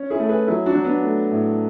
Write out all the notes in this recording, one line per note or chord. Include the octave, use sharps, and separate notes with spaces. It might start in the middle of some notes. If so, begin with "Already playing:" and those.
Already playing: C#4
E4 G#4
A3
G#4 B4
F#3 E4 G#4
D4 F#4
F#3
B3 D4
A3
A2